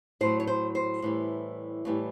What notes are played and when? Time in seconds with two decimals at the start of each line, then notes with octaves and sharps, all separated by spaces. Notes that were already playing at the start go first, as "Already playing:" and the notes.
0.21 A2 F#3 C5
0.40 C#5
0.47 C5
0.75 C5
1.02 A2 E3 G3
1.85 A2 E3 G3